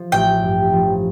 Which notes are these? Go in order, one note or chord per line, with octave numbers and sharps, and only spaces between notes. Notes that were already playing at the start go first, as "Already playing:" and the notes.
Already playing: F3
A1 G5
G2
F3